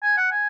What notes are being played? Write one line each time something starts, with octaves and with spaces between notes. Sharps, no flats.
G#5
F#5
G#5